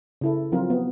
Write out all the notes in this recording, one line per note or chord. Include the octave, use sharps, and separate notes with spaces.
C#3 E4 A4
F3 F#3 C4 F4 A#4
B3